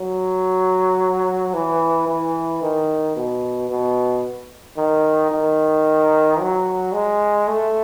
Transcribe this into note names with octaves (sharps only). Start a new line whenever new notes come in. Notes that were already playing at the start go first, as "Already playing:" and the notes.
Already playing: F#3
E3
E3
D#3
B2
B2
D#3
D#3
F#3
G#3
A3